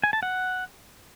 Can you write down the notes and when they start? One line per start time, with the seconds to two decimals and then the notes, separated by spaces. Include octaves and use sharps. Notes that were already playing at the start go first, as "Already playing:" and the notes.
0.04 G#5
0.13 A5
0.23 F#5